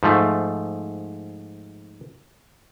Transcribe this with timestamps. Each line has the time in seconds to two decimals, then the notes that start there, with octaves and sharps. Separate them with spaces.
0.03 G#2 F3 A3